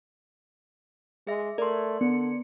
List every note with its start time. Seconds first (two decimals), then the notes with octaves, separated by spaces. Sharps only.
1.27 G#3 G#4 E5
1.58 A3 A#4 D5 C6
2.00 D3 B3 C#7